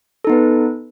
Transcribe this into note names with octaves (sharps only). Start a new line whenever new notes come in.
B3 D#4 A4 B4